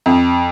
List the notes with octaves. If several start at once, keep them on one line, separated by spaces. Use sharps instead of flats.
F2